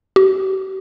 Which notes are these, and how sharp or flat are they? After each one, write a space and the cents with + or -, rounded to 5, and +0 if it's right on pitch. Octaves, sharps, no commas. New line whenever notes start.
G4 -45